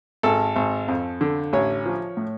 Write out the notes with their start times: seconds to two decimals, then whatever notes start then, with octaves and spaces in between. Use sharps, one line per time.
0.23 G#1 A4
0.56 G#1
0.88 F2
1.21 D3
1.53 A1 C#5
1.86 F3
2.17 A2